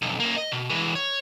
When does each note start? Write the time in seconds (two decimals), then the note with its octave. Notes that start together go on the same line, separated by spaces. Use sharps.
0.02 B1 F2
0.20 A#3 C#4
0.36 D#5
0.51 B2
0.70 E3 G#3
0.95 C#5